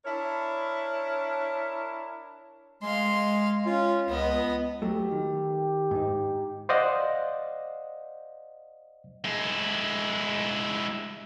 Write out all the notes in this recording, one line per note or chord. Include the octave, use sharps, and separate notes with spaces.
D4 E4 A#4 C#5
G#3 F5 C6
C#4 F4
C#2 B3 D#5
F#3 A3 G4
D#3
G#2 D#4
C5 D5 D#5 F5 F#5
G#3 E4